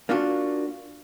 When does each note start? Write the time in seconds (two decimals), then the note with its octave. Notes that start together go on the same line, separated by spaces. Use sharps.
0.09 A#3 D4 F4 F#4